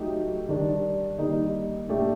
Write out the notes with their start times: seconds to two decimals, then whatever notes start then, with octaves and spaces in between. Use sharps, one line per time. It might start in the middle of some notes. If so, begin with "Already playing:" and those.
Already playing: F#3 A3 D#4 G4
0.48 D#3 G3 D4
1.18 D#3 G3 A#3 D#4
1.88 A#2 A3 D4 G4